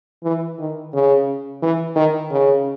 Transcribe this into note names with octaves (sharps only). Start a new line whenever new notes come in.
E3
D#3
C#3
E3
D#3
C#3